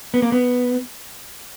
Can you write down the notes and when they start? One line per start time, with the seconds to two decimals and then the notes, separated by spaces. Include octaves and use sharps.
0.14 B3
0.22 A#3
0.32 B3